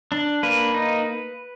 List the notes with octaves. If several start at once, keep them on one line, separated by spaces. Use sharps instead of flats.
D4
A#3 B4
D#4